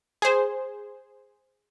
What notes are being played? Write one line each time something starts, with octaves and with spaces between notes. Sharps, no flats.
G#4 C5